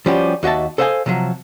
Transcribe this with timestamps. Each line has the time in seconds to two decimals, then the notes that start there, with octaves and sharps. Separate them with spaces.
0.06 F3 G3 C#4 F#4 G4
0.43 D#2 F#4 D#5 E5 A5
0.78 A4 C5 D#5 F5 F#5 G#5
1.06 C3 F3 F#3